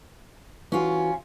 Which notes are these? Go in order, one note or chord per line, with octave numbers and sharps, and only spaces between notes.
E3 C#4 F4 F#4